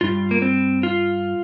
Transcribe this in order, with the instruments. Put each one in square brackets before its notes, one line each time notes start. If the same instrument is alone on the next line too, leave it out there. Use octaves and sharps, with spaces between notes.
[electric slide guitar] G2 G3 F4
A#3
C4
F4